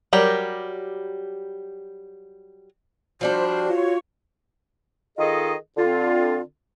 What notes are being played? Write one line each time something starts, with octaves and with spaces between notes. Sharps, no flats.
F#3 G3 G4 A#4
F3 G3 D4 F#4 C5
F4 C#5
D#3 F4 G#4 A4 D#5
D3 C4 F4